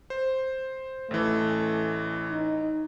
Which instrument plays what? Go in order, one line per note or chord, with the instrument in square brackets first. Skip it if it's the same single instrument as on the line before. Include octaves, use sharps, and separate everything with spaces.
[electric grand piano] C5
[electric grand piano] A1 E3 [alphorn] A3
[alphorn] D#4